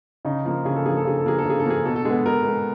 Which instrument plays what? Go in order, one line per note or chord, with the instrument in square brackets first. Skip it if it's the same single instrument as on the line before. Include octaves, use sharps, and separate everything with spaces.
[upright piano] C#3 D#4
F3 A#3
C#3 G#4
A4
F3 A#3 G#4
A4
C#3 G#4
A4
F3 A#3 G#4
A4
C#3 G#4
A4
F3 A#3 G#4
B2 A4
A4
G#3 B3 G#4
B2 A#4
G#3 B3